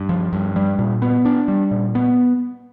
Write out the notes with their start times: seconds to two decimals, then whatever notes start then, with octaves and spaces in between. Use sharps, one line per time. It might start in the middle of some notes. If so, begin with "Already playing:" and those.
Already playing: G2
0.09 F3
0.33 G2
0.56 G3
0.79 A#2
1.02 B3
1.25 D4
1.48 G3
1.71 A#2
1.95 B3